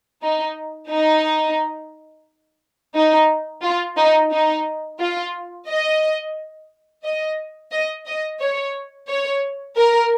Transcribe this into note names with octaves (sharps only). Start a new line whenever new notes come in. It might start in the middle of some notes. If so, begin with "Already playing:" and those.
D#4
D#4
D#4
F4
D#4
D#4
F4
D#5
D#5
D#5
D#5
C#5
C#5
A#4